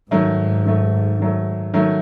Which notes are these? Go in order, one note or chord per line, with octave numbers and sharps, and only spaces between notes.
G#2 D#3 F#3 A3
D#3 F#3 A3
D#3 F#3 A3
D#3 F#3 A3